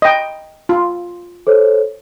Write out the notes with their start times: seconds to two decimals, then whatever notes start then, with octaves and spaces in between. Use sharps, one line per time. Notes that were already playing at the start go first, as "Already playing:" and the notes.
0.02 D#5 G5
0.69 F4
1.47 A4 C5 C#5